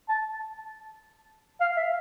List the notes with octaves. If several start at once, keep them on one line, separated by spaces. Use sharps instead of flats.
A5
F5
E5